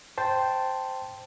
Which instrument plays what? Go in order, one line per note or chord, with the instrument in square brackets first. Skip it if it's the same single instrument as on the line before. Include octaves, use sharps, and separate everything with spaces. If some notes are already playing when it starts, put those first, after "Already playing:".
[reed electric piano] C5 G5 A5 C6